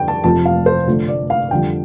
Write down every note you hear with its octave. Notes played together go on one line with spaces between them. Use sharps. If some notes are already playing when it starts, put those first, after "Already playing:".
Already playing: F2 D3 G3 G5
A5
F1 F2 C3 F3 A3 A5
F5
C5
F1 F2 D3 F3 A3
D5
F5
F2 D3 G3 G5